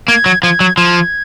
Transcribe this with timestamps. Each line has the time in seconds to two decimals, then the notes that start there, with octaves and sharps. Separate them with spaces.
0.08 A#3 G#6
0.26 F#3
0.43 F3 G#6
0.60 F#3
0.77 F3 G#6